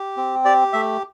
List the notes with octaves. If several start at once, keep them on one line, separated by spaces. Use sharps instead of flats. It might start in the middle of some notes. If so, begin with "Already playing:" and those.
Already playing: G4
C4
G4 D5
A3 E5